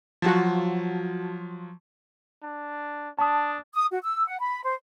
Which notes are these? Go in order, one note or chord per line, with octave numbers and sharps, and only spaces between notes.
F3 F#3 F4 F#4 A5
D4
D4 A5 D#6
D#6
F#4
E6
F#5
B5
C5